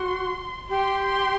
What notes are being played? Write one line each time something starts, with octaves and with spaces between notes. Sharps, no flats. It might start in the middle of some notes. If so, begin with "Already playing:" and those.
Already playing: F#4 C6
G4 C6
C6